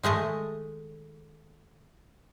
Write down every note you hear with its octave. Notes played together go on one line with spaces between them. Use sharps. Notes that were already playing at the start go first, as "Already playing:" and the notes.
D#3 G#3 A3 D#5